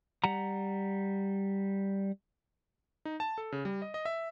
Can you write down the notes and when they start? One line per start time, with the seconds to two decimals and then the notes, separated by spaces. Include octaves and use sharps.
0.24 G3 F#5 A#5
3.05 D#4
3.20 A5
3.38 A4
3.52 C#3
3.65 G3
3.82 D#5
3.94 D#5
4.05 E5